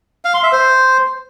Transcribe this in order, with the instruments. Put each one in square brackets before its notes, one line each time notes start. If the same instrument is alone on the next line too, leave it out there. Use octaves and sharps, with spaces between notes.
[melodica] F5
C6
E5
C5